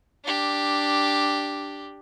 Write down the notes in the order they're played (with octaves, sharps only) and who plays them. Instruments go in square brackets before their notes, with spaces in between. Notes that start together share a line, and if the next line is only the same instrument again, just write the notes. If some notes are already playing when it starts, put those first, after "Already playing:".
[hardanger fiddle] D4 G4